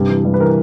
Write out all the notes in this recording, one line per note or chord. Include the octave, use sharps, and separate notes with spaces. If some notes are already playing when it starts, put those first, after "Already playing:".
Already playing: G2 C3 G4
E3
G2
B4
E3 A#4